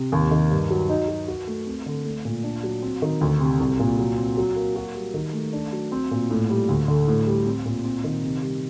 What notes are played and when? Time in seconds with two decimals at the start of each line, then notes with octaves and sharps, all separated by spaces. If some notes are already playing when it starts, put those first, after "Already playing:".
Already playing: C3
0.12 D#2
0.31 D#3
0.51 G2
0.70 F#3
0.89 D#4
1.08 F#3
1.28 F#4
1.47 A3
1.66 C4
1.86 D3
2.05 A3
2.25 A#2
2.43 D4
2.63 F#3
2.82 C4
3.02 D#3
3.21 D2
3.40 C3
3.60 C2
3.79 A#2
3.99 F#3
4.17 C4
4.37 F#3
4.56 A#3
4.76 F#4
4.95 G3
5.14 D#3
5.33 A3
5.53 D4
5.72 F#3
5.92 C4
6.11 A#2
6.30 A2
6.50 G3
6.69 D2
6.88 D3
7.08 A2
7.27 G3
7.46 C4
7.65 A#2
7.84 C4
8.04 D#3
8.23 C3
8.42 G3